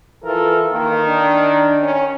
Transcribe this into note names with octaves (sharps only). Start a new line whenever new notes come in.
E3 F4 A4 A#4
D#3 A#3
D4
C#4